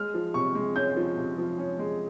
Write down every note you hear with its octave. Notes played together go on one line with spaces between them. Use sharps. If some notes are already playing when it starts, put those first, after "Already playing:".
Already playing: G#3 F6
F3
C3 C#6
G#3
C#4 G6
F3
C3
F3
C#4
G#3